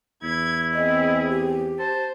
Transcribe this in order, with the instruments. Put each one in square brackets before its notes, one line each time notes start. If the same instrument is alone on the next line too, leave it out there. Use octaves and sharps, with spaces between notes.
[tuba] E2 [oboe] E4 [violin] G#6
[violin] C4 G#4 [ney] D#5
[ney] G4
[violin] C5 [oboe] A5